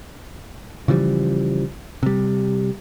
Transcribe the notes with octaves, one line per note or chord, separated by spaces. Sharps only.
C#3 E3 F3 G3
C3 G3